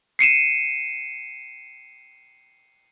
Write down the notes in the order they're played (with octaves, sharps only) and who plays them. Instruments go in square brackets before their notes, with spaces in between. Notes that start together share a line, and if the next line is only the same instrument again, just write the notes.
[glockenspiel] C7 C#7 D#7 E7